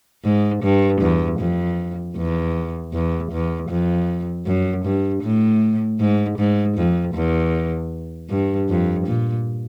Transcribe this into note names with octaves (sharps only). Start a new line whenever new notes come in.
G#2
G2
E2
F2
E2
E2
E2
F2
F#2
G2
A2
G#2
G#2
F2
E2
G2
F2
A#2